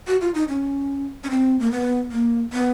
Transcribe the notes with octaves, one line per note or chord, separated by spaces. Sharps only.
F#4
F4
D#4
C#4
C#4
C4
A#3
B3
A#3
B3